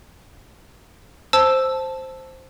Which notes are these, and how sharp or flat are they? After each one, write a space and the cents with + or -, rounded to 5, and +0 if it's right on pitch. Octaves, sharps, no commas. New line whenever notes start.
C5 +0 A5 +0 E6 +0